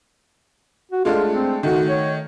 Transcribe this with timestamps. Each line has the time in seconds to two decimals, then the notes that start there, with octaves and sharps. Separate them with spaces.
0.91 F#4
1.05 G#3 A3 D4 F4
1.31 C4
1.63 D#3 A3 F#4
1.89 C#5